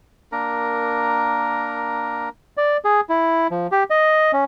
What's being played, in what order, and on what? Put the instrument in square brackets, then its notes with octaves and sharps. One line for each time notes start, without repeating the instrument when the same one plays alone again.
[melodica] A#3 D4 A#4 A#5
[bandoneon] D5
G#4
E4
F3
G4
D#5
C#4